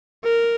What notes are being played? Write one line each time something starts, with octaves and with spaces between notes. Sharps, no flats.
A#4